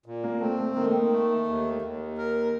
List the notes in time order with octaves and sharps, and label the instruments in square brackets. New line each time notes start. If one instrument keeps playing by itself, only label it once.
[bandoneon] A#2
[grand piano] A#3
[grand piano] A3 [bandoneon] C4
[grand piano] A3
[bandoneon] D#3 [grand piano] A#3
[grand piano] A3
A#3
[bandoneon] A3
D#2
D#2
A#4